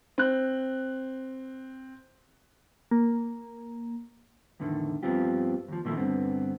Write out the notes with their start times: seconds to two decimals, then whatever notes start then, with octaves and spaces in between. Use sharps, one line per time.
0.18 C4 F#6
2.91 A#3
4.60 E2 A2 D3 D#3
5.03 G2 F3 B3 C4 F4 G4
5.68 D#2 F3
5.85 A#2 D#3 F3 A3 A#3 E4
5.97 G2 D3 B3 C4